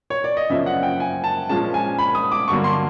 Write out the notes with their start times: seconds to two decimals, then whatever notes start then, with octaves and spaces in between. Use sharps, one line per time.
0.10 C#5
0.24 D5
0.37 D#5
0.50 F#2 C#3 F3 A#3 C#4 E5
0.66 F#5
0.83 G5
1.00 G#5
1.24 A5
1.49 A#2 F3 G#3 C#4 A5
1.74 G#5
1.98 B5
2.15 D#6
2.32 D6
2.48 G2 D3 F#3 A#3 C#6
2.64 C6